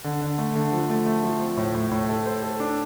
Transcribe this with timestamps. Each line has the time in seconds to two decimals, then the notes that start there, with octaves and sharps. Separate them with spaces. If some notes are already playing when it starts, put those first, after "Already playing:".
0.04 D3
0.21 D3
0.38 A3
0.55 D3
0.72 F3
0.90 A3
1.06 A3
1.23 F3
1.40 C4
1.57 A2
1.74 A2
1.91 A2
2.09 A4
2.26 C5
2.42 A4
2.60 D4